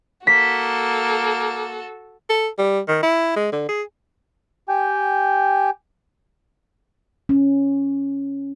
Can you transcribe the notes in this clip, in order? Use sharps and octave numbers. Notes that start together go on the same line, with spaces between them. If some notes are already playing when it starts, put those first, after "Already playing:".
A#3 F#4 A4 B6
A4
G3
D#3
E4
G#3
D3
G#4
G4 G5 G#5 G6
C#4